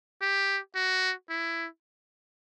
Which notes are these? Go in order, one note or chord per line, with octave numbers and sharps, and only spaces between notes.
G4
F#4
E4